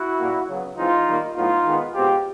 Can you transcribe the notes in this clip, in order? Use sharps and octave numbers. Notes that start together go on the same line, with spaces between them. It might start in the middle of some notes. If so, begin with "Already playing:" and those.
Already playing: E4 F#4
A#2 G3 A#3
C#3 F#3 B3
E3 G#3 C4 D#4 F4
D#3 G3 A#3
A2 F#3 B3 D#4 F4
D#3 G#3 B3
B2 G#3 C4 F4 G4